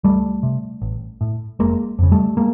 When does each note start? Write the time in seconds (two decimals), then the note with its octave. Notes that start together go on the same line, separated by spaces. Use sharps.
0.04 C#2 G3 A3
0.43 C3
0.82 A1
1.21 A2
1.59 F1 G#3 A#3
1.99 F2 C#3
2.12 G3 A3
2.37 G#3 A#3